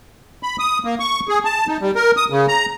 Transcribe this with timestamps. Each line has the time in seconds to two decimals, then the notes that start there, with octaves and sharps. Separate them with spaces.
0.43 B5
0.59 D#6
0.85 A#3
1.00 C#6
1.29 G#4
1.45 A5
1.67 D#4
1.81 G3
1.95 A#4
2.17 D#6
2.30 C#3
2.48 A#5